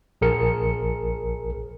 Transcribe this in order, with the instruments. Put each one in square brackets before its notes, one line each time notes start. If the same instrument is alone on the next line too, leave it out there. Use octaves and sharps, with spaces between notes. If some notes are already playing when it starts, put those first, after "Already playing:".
[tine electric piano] A#1 G#4 A#4 C#7